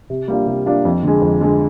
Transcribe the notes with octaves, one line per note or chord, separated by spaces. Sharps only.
C3
G3 A#3 D4 F4
C3
G3 A#3 D4 F4
F2
D3 G#3
F2
D3 G#3